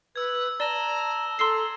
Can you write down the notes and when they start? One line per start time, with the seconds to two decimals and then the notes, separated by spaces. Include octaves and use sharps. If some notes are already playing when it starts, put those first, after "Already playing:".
0.16 B4 E6 G#6
0.60 D5 A5 A#5 A#6 E7 G7
1.39 A4 A#5 C6 E6 C7